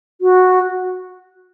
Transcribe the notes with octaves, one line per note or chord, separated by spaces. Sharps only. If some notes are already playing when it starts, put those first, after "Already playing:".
F#4